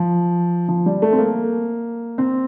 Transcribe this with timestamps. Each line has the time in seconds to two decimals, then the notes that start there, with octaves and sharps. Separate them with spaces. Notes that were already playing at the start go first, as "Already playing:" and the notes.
Already playing: F3
0.69 F3
0.86 G3
1.02 A3
1.13 C4
1.19 A#3
2.18 C4